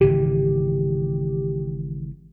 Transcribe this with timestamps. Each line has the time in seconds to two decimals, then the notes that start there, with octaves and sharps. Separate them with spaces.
0.01 G#1 C#3 E3 G4